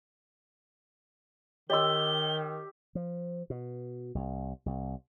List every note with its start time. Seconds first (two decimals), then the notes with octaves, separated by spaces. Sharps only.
1.70 D#3 G4 C#5 D#5 C6 E6 G7
2.95 F3
3.50 B2
4.15 C2
4.66 C2